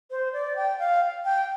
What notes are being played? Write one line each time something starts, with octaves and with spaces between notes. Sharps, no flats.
C5
D5
G5
F5
G5